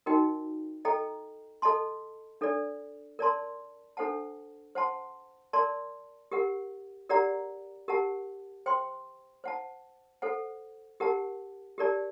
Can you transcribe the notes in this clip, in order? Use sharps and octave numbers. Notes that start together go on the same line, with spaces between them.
D#4 F#4 A#4 D#5 G5
A4 D#5 G5 A#5
A4 D#5 A5 C6
D4 A4 D5
A#4 D5 A5 C6
D4 A4 C5 F#5 A5
C5 F#5 A5 C6
A#4 D5 A5 C6
G4 A#4 F#5
G4 A#4 D5 F#5 A#5
G4 A#4 F#5 A5
C5 G5 C6
C5 F#5 A5
A4 C5 F#5
G4 A#4 F#5 A5
G4 A#4 D5 A5